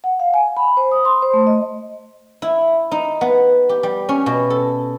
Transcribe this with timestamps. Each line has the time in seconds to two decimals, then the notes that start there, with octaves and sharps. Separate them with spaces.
0.04 F#5
0.20 F5
0.34 G#5
0.57 B5
0.77 C5
0.92 D#6
1.05 C6
1.22 C5
1.33 A3
1.47 D#5
2.42 E4
2.91 D#4
3.21 B3
3.69 G4
3.83 G3
4.09 C#4
4.26 B2
4.50 A4